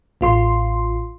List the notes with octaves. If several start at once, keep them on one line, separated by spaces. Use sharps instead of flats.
A1 F4 C6